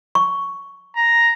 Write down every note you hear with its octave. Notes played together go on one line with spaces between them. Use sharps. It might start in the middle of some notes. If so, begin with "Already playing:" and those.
C#6
A#5